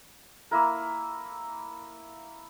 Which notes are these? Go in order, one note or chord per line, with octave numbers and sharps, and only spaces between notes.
A#3 E4 A#4